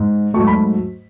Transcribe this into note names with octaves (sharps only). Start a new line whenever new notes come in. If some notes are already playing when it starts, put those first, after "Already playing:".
Already playing: G#2
G#2 F#3 A3 C#6
B5